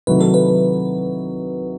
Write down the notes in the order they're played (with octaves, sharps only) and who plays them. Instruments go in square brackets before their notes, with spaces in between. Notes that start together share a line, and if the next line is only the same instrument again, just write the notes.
[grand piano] C3 D#3 F#3 A3 E4 [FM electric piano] B4
[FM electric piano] A4
B4